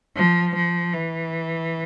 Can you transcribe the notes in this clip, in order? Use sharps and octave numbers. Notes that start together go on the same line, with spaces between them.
F3
F3
E3